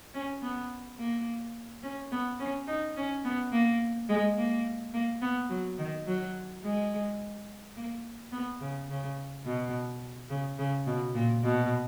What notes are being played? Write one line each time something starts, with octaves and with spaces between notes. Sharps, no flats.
C#4
B3
A#3
C#4
B3
C#4
D#4
C#4
B3
A#3
G#3
A#3
A#3
B3
F#3
D#3
F#3
G#3
A#3
B3
C#3
C#3
B2
C#3
C#3
B2
A#2
B2